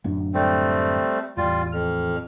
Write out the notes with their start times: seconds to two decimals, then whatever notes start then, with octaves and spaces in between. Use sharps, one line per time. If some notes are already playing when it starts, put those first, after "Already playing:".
0.04 D1 F#2 D4
0.34 G3 A3 C4
1.37 A1 E2 G3 F4
1.72 F2 F6